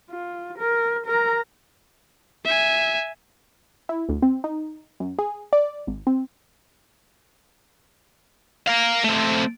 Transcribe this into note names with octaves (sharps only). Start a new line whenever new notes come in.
F4
A#4
A#4 A#5
E5 G#5
E4
D2
C4
D#4
F#2
G#4
D5
G#1
C4
A#4 F5
A3 C4